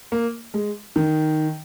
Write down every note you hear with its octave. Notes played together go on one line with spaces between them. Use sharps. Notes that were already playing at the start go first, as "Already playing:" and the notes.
A#3
G#3
D#3